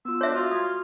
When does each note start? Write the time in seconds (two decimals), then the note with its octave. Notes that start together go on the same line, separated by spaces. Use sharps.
0.05 B3 F4 E6
0.21 D4 C#5 E5 C6
0.34 F4 F#4
0.51 D#6 G#6
0.63 F6